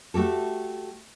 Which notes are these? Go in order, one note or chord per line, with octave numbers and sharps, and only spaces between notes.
A3 F#4 G4 A4